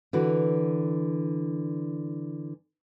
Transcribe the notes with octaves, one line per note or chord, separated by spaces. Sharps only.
D3 E3 F#4